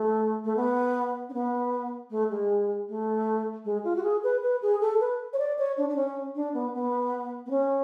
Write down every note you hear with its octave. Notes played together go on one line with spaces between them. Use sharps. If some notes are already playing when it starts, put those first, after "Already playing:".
Already playing: A3
A3
B3
C#4
B3
A3
G#3
A3
G#3
F4
F#4
G#4
B4
B4
G#4
A4
B4
C#5
D5
C#5
D4
D4
C#4
D4
B3
B3
B3
C#4